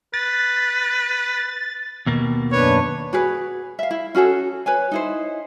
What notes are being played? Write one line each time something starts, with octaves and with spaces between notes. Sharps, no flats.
B4 A6
D#2 B2 A#3
F#2 D4 B4 C#5
F#4 G#4 B4
E5 F5
E4
C#4 F#4 G#4 A4
B4 C#5 G#5
D#4 E4 C5